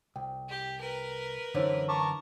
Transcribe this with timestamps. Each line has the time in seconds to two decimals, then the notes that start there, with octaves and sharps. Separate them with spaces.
0.16 C2 G5
0.49 G4
0.81 A#4 B4
1.55 F#2 D3 E3 D#4 C5 C#5
1.89 A#4 A5 C#6 D6